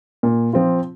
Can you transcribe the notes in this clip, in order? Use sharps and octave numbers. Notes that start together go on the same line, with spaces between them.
A#2
F3 C4 F4